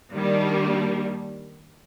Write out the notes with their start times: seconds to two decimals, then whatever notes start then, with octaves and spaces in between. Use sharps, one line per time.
0.14 D#3 G3 A#3 D4